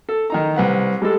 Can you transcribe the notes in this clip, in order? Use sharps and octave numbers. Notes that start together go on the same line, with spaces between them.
A4
D#3 D#4 A#5
C2 B4 F#5
G3 G#3 A4